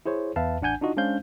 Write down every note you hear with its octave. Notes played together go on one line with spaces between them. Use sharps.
E4 G#4 C5 C#5
E2 B4 E5 F5 A5
A1 D4 F#5 G#5 G6
D4 D#4 F4 F#4 D#5
G#3 C#4 D4 C5 F5 G6